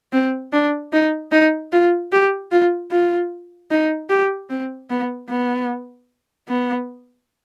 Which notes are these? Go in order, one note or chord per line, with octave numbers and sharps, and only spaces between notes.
C4
D4
D#4
D#4
F4
G4
F4
F4
D#4
G4
C4
B3
B3
B3